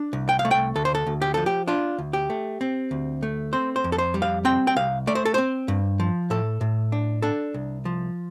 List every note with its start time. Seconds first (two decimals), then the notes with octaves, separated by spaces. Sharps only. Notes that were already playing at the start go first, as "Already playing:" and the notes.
Already playing: D4
0.13 C2
0.29 G5
0.39 F5
0.45 A3
0.51 G5
0.75 D2 A4
0.85 C5
0.95 A4
1.07 D2
1.22 G4
1.34 F3 A4
1.46 G4
1.68 D4 F4
1.99 D2
2.13 G4
2.30 A3
2.61 C4
2.91 D2
3.23 A3
3.53 C4 C5
3.76 C5
3.84 F2
3.92 A4
3.98 C5
4.14 G3
4.22 F5
4.45 C4 G5
4.67 G5
4.76 C2 F5
5.07 A3 D5
5.15 C5
5.25 A4
5.34 C4 C5
5.68 G2
6.00 F3
6.30 A2 A4
6.61 A2
6.92 D4
7.22 D4 A4
7.54 C2
7.85 F3